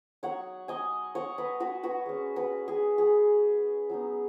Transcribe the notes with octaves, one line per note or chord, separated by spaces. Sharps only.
F#3 D#4 C#5 F#5
D#5 G#5
C#5 F#5
B4 D#5
F#4 B4
F#4 B4
G#3 C#4
F#4 B4
G#4
G#4
F#3 B3 D#4